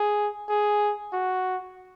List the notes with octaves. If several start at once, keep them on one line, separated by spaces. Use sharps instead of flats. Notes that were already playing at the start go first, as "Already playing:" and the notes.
Already playing: G#4
G#4
F#4